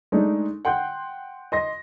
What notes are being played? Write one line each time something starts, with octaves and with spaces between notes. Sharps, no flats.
G#3 A3 D4 D#4
F#5 G5 C6 F#6 G6
D#5 C6 A#6